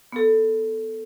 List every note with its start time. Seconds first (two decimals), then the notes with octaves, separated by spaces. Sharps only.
0.12 B3 A4